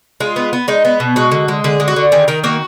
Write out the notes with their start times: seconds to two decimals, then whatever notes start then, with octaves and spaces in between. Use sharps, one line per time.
0.20 G#3 F4
0.36 B3
0.53 B3
0.68 G#3 D#4
0.85 B3
1.00 B2
1.16 G#3 F#4
1.31 D3
1.48 G#3
1.64 D3 G#4
1.80 G#3
1.88 F#4
1.96 D3
2.12 D#3 G#4
2.28 D#3 A#4
2.44 A#3 F#4